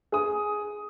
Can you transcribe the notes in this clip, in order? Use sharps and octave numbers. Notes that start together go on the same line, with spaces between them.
G#4 D#6